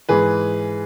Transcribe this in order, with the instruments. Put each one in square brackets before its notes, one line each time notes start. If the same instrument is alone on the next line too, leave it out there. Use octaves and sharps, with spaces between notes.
[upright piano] G#2 E3 G#4 B4